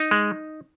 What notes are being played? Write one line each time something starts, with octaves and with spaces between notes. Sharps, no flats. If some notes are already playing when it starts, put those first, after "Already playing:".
Already playing: D#4
G#3